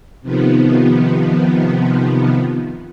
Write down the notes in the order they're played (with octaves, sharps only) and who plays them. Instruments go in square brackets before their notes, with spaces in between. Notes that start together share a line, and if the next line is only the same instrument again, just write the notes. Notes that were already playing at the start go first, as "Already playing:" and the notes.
[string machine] C3 D#3 F3 B3